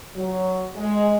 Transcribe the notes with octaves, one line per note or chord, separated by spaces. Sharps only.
F#3
G#3